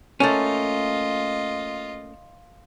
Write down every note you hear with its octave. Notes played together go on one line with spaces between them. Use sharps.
A3 A#3 C#4 F4 D#5